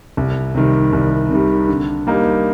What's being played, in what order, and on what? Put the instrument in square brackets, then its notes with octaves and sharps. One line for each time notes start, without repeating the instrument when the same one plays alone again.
[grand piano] C2
C3 D#3 G3
C2
C3 D#3 G3
D3
G3 A#3 D#4